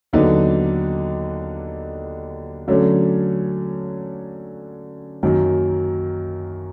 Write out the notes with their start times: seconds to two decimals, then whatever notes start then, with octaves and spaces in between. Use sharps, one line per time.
0.13 D#2 D3 F#3 B3 D#4
2.68 D3 F#3 A3 C#4
5.23 F#2 D#3 F#3 A#3